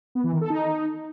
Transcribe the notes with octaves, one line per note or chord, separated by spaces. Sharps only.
B3
E3
D#3
A4
D#4